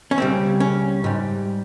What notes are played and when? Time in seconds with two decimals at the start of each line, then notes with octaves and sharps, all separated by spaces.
0.11 C#4
0.18 C#2 C#3 G3 C4
0.60 C#4
1.04 G#2 G3